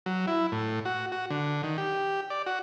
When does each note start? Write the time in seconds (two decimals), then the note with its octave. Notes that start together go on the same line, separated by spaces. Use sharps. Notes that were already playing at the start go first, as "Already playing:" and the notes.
0.06 F#3
0.27 E4
0.52 A2
0.85 F#4
1.12 F#4
1.30 D3
1.63 D#3
1.78 G4
2.30 D5
2.46 F#4